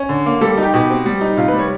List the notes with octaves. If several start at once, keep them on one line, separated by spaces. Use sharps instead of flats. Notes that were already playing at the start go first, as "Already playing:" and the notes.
Already playing: C#4
D3
A#3
G3 A4
D#4
G4
B2 G4
C4
G3
D#4
C3 F4
B4
G3
C#5